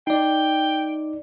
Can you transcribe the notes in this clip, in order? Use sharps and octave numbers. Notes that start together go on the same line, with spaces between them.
D#4 D5 G5